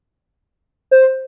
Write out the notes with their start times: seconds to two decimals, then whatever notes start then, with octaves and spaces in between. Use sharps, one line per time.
0.91 C5